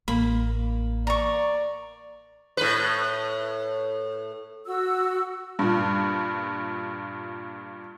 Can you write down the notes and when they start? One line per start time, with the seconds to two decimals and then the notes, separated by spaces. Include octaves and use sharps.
0.08 A1 A#3 B5
1.07 D5 A#5 C#6
2.57 A2 B4
4.66 F#4 E6
5.59 G2 A#2